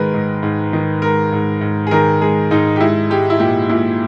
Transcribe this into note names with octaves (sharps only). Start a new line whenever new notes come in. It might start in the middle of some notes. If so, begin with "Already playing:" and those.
Already playing: G#2 D#3 G#3 A#4 B4
G#2
G#2
D#3
G#3 A#4
G#2
G#2
G#4
D#3 A#4
G#3 G#4
G#2 D#4
G4
G#3 E4
G#3 G4
E4
A#2 G4
A#2 E4